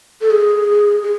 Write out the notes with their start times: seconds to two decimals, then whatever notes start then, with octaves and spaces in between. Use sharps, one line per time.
0.21 A4
0.31 G#4
1.03 G#4